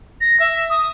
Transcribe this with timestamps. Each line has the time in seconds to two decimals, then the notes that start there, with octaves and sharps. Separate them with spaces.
0.21 A#6
0.40 E5
0.70 D#6